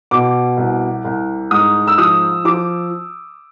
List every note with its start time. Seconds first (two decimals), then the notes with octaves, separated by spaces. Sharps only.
0.11 B2 D6
0.57 C2
1.05 C2
1.51 G#2 D#6
1.87 E6
1.98 F3 D#6
2.45 F3 D6